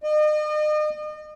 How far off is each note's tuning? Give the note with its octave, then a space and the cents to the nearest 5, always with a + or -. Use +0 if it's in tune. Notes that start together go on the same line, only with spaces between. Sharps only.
D#5 -40